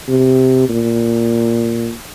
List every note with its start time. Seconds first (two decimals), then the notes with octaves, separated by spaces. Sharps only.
0.08 C3
0.69 A#2